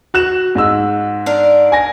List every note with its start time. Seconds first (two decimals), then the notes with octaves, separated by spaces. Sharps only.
0.14 F#4 F#6 E7
0.55 G#2 D#5 E6
1.26 D4 A#4
1.72 G#5 A#6